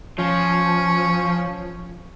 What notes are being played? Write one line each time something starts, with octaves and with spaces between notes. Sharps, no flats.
F3 C#4